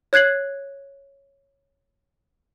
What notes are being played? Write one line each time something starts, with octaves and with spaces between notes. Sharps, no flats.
C#5 F#6 G#6 C7 F#7